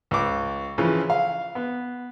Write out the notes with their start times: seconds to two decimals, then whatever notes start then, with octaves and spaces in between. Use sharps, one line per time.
0.11 C#2 D6
0.78 C#3 E3 F3
1.10 F5
1.55 B3